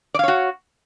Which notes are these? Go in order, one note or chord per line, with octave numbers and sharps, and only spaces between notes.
F#4 C#5 D5 F5